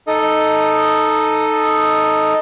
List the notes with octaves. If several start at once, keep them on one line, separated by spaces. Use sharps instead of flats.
D#4 A4 D#5